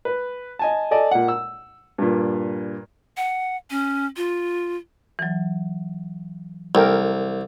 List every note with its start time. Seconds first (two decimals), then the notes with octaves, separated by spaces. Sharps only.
0.05 B4
0.59 D#5 G#5 A5
0.91 A4 D5 D#5 G#5 A5
1.11 A#2 F#5
1.28 E6
1.98 G2 A#2
3.17 F#5
3.70 C#4
4.16 F4
5.19 E3 F#3
6.75 C2 A4 A#4 G5